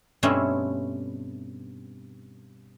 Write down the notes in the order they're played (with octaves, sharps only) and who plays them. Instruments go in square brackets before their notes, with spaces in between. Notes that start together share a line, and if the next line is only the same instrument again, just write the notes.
[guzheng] G2 B2 A3 C4 C#4 E4